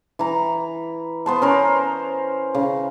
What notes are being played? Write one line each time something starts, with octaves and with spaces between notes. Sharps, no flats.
E3 A#5
B3 C5 A5
C#4 A#4 C5
C#3